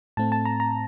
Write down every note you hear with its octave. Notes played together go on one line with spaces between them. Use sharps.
A2 A3 C4 A5
A5
A#5
A#5